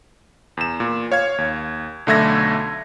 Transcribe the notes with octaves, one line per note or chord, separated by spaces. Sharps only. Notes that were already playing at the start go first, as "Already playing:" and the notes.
E2 E7
A#2
C#5 F5 G#6
D#2
B1 D3 A3 E5 G#6 A#6